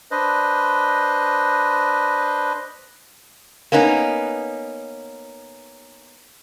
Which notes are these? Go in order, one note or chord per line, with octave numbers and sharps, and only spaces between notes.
D4 B4 C5 D#5
A#3 B3 C#4 D#4